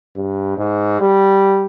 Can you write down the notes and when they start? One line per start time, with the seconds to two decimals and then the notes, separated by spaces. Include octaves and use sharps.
0.16 G2
0.58 G#2
1.01 G3